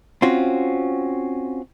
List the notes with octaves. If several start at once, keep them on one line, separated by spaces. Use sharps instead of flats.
C4 C#4 F4 F#4